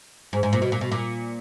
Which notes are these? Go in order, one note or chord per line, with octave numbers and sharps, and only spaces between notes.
G#2
G#2
A#2
B2
A#2
B2
A#2